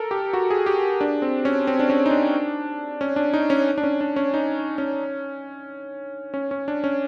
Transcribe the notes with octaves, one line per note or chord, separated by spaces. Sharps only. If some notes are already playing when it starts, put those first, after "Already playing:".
Already playing: A4 A#4
G4
F#4
G#4
G4
D4
C4
C#4
C4
D4
C#4
D#4
D4
C#4
D4
D#4
C#4
D4
C#4
D4
C#4
D#4
C#4
C#4
C#4
D4
C#4